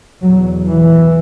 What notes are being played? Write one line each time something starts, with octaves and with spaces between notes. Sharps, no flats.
E2 B2 F#3
E3